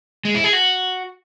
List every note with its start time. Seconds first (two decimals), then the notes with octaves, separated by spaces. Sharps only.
0.25 G#3
0.35 E4
0.44 G#4
0.53 F#4